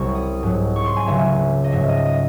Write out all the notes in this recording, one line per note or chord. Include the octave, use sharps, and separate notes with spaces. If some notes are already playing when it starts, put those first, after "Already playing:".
Already playing: C2 C3 F#3 C#6
D#6
G#2 F#3
C#6
C6
G#5
C#2 C#3 F#3 E5
D#5
G#2 F#3 E5
D#5
D#5